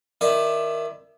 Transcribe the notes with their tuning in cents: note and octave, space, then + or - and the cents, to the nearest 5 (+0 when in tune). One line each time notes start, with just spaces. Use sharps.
D#3 +0 E4 +15 D5 +20